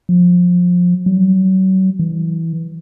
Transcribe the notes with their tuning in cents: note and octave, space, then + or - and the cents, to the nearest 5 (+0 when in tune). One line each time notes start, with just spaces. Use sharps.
F3 +25
F#3 +35
E3 -10